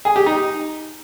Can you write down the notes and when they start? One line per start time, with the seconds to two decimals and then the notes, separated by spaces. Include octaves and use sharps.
0.05 G#4
0.16 G4
0.26 D#4